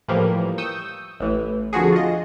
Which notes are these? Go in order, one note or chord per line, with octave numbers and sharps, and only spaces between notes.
A2 E3 F3 G3 A#3
C#6 D#6 E6 G6
A1 A2 E3
F2 D3 F3 F#4 G#4
F4 D#5